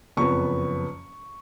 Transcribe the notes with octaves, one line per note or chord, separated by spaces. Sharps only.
F#1 F2 F3 B3 C#6